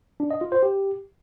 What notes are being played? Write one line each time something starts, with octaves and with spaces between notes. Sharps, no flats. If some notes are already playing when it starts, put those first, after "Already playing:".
D4
D#5
F4
C5
G4